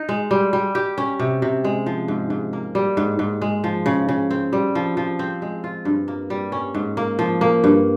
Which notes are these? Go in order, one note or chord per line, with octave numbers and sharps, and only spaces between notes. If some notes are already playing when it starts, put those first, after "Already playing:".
Already playing: D#4
G#3
G3
G3
G4
C#4
C3
C3
G#3
F3
G#2
G#2
A#3
G3
G#2
G#2
G#3
F3
C#3
C#3
C4
G3
F3
F3
C4
G#3
F4
G2
A#3
G3
C#4
G#2
A#3
F3
A#3
G2